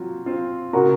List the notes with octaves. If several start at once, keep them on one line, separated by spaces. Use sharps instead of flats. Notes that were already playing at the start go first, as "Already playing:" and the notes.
Already playing: F#3 C4 F4
C4 F4
C#3 F#4 A#4